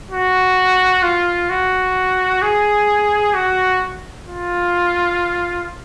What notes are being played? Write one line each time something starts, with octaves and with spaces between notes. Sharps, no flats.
F#4
F4
F#4
G#4
F#4
F4